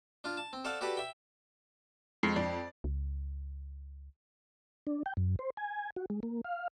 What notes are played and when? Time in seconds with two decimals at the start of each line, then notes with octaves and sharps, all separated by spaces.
0.24 D4 F4
0.37 A5
0.53 C4
0.65 A4 C5 D5 F5 F#5
0.81 F#4 G4 A4 B4 D5 F#5
0.97 E5 G5
2.23 F2 G#3 C7
2.36 F2 D5
2.84 C#2
4.87 D4
5.06 G5
5.17 F#2
5.39 C5
5.57 G#5
5.96 F#4
6.10 G#3
6.23 A#3
6.45 F5